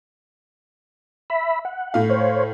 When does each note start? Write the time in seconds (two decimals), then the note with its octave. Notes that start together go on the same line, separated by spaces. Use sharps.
1.30 E5 B5
1.65 F#5
1.94 A2 F5
2.09 C5 C#5